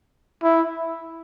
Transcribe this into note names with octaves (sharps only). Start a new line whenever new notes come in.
E4